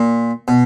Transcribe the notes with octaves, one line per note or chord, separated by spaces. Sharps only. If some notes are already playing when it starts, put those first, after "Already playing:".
Already playing: A#2
B2